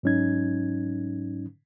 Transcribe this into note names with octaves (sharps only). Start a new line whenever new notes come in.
G#2 F#3 C#4 D#4 G#6